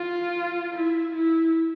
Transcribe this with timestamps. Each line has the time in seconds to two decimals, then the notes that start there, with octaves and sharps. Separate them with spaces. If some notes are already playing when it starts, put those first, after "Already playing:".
Already playing: F4
0.74 E4
1.15 E4